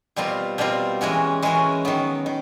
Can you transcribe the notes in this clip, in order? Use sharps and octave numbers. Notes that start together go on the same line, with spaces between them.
B2 G3 C4 F4 A#4
B2 G3 C4 F4 A#4
E3 G#3 C#4 F#4 A#4
E3 G#3 C#4 F#4 A#4
D#3 F#3 B3
D#3